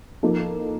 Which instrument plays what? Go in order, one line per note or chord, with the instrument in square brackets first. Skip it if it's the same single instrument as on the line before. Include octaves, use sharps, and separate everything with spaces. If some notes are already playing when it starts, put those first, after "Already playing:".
[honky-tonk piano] F3 A#3 D#4 A4